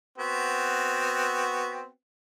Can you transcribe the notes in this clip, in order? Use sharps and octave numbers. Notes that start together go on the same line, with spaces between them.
B3 C4 F#4